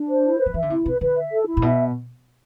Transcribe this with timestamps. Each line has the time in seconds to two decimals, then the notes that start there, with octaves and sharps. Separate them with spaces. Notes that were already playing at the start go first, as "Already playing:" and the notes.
Already playing: D4
0.09 C5
0.24 E4
0.39 B4
0.46 F3
0.54 E3 E5
0.62 D3
0.70 C3 E4
0.85 C3 B4
1.01 D3 B4
1.16 E5
1.31 A4
1.47 E4
1.57 A2
1.62 B2 E5